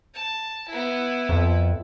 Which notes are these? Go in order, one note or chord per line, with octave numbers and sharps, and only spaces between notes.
A5
B3 E4
F2